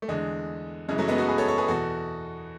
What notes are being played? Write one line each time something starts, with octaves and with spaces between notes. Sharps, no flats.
A3
E2 D3 G#3
F#2 C#3 E3 G#3
F#3 A3
G#3 B3
F#4 A4
G#4 B4
A4 C#5
A4 C#5
G#4 B4
E2 B2 F#4 A4